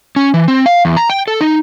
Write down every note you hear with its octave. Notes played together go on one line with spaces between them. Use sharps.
C#4
E3
C4
F5
E2
A#5
G5
A4
D#4